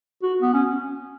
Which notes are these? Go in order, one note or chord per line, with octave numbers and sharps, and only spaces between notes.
F#4
B3
C#4